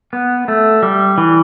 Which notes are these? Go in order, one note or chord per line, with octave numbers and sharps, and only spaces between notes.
B3
A3
G3
E3